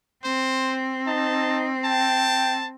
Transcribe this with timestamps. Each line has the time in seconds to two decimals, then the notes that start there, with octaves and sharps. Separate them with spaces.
0.24 C4 C5
1.07 D#4 A5
1.85 G5 A5